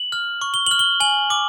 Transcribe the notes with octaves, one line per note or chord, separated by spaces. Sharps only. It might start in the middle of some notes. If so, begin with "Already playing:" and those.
Already playing: F#7
F6
C#6
G7
F6 F#7
G7
G#5 F#7
D6